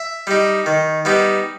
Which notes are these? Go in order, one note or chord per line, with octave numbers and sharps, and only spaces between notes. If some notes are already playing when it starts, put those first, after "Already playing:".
Already playing: E5
G3 D#4
D#3
G3 B3 D#4